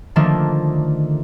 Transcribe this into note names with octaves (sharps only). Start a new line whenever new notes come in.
D3 D#3 F3 A3 A#3 D4